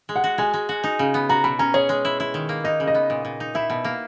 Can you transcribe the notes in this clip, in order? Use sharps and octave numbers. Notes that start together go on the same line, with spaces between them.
G#3
F#5
F#4
G#3 G#5
G#3
F#4
D#4
C#3
B3
F#4 A#5
B2 B5
C#4 A#5
G#4 C#5
G#3
E4
E4
D#3
A#3
D#4 D#5
C#3
D#5
B3
A#2
A#2
D#4
E4 E5
B2
A#3